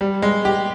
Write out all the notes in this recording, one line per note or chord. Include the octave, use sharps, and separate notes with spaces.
G3
G#3
G4